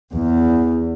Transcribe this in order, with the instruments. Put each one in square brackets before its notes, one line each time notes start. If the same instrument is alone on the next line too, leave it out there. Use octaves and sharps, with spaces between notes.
[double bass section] E2